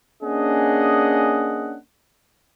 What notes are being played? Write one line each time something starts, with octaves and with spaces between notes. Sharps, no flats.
A#3 C#4 D4 G#4 D#5 F#5